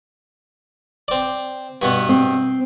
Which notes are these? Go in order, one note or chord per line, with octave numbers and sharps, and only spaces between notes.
C4 D5
G2 B2 B3
C4